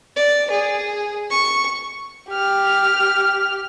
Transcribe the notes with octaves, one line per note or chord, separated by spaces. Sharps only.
D5
G#4
C#6
G4 F6